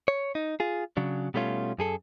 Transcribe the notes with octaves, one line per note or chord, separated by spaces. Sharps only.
C#5
D#4
F4 G#4
C#3 F#3 D4
B2 G3 A3 C#4 F4
F#2 G#4 A4